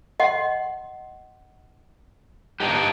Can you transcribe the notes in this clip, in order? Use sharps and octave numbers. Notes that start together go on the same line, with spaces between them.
D#5 F#5 C6
D4 D#4 G4